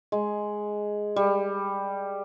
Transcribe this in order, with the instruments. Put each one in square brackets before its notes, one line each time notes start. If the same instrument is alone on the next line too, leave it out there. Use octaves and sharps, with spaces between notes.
[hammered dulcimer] G#3
G3